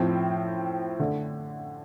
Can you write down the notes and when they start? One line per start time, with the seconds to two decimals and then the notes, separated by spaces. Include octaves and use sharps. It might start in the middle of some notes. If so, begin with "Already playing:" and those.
Already playing: A2 F3 C4
0.99 D3 A3 D4